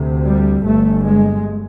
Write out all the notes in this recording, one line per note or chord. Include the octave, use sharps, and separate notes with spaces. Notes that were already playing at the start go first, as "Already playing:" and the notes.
Already playing: D2 C3
G3
G1 G2 A3
G#3